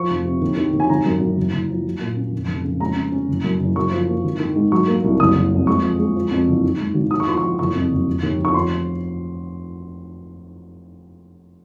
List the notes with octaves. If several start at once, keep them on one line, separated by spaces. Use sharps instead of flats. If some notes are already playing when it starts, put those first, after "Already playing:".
Already playing: F3 C#6
F1
C3
D#2
D#3
D#2
G#5
G#1 A#5
F#2
F#2
F#1
F#1
F3
F#3
A#2
C#4
F1
F1
C#3
G#3 A#5
C#4
C#4
F#1
F#2
F#1
F#2 C#6
F3
A#3
G#1
D#3
G#2
F#3 C#6
A#3
C2
F#1 D#6
F#1
F2
G#3 C#6
F3
G#3
F3
F2
F#1
D#3
G#2
G#1
D#2 D#6
C#6
F3 C6
C#6
F3
F#1 C#6
F2
F#1
F1
D#2
F1
C#6
F3 C6